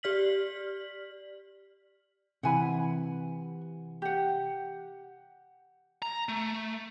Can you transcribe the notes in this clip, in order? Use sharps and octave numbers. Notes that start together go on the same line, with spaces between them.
G4 D5 F6 B6 F#7
C3 E3 F#5 G#5 B5
G4 F#5
A#5
A3